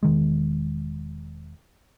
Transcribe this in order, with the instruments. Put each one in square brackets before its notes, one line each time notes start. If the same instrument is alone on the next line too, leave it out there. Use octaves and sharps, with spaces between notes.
[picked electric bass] E1 D#3 G#3